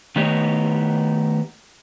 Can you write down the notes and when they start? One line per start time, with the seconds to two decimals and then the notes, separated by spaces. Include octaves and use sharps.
0.16 D#3 A3 B3 D#4 G4 C#5